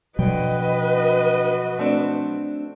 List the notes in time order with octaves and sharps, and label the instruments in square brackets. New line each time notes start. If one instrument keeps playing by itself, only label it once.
[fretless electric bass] B2 F3 F#3 [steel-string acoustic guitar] D3 G5 [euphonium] F#4 [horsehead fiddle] B4 D#5
[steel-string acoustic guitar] A3 C4 D4